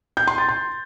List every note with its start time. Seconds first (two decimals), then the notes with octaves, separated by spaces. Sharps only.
0.17 G6
0.27 C6
0.38 A6
0.49 C6